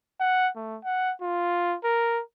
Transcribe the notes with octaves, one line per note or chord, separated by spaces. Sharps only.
F#5
A3
F#5
F4
A#4